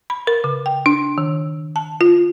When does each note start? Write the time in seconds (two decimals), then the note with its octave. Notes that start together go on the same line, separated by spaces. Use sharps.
0.10 B5
0.27 A#4
0.44 C#3
0.66 G5
0.86 D4
1.18 D#3
1.76 A5
2.01 F4